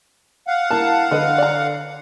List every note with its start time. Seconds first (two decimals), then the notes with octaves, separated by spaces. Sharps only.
0.47 F5 F#5
0.71 A#3 E4 A5
1.11 D3 B4 D#5 B5
1.38 D5 A#5